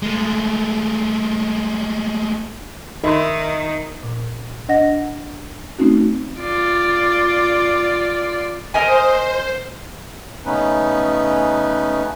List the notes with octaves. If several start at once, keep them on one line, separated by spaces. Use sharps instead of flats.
G#3 A3
D#3 D#4 A#4 D#5 E5 C6
A#2
D4 D#5 F#5 A#6
A3 C4 C#4 D#4 F#4
F4 D5
A#4 C5 D#5 G#5
C#3 A3 B3 C#4 D#4 B4